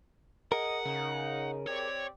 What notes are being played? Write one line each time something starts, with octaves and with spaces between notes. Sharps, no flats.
G#4 A#4 D#5 F#5
C#3 D#4
C4 G4 C#5 D5